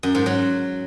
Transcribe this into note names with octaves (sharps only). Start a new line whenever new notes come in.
F#2
G#2
F#3